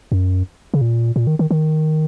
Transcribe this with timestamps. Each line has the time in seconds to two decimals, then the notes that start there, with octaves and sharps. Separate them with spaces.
0.12 F#2
0.74 C#3
0.81 A#2
1.16 A#2
1.27 D#3
1.39 D#3
1.51 D#3